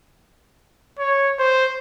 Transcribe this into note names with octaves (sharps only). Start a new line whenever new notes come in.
C#5
C5